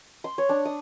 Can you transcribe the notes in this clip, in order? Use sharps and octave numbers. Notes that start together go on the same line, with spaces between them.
C6
C#5
D4
D#6